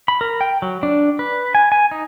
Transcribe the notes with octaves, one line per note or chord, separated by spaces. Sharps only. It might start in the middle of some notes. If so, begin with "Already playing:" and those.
B5
A#4
G5
F#3
D4
B4
G#5
G#5
D#4